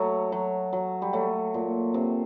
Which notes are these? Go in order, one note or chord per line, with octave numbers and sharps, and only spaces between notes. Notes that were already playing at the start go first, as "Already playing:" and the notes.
Already playing: F#3 A3
F#3
F#3
G3
F#3 A3
A#2
C3